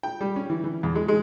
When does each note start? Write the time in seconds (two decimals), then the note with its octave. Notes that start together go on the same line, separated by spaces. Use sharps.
0.03 G5
0.21 G3
0.36 C#4
0.50 E3
0.64 E3
0.83 E2
0.95 G#3
1.08 G#3